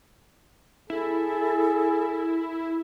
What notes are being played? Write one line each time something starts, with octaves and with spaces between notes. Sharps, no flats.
E4 G#4 A4